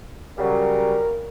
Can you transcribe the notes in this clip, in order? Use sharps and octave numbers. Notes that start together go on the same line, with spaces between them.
C#3 F#3 G3 A#4